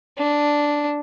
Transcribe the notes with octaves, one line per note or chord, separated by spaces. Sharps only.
D4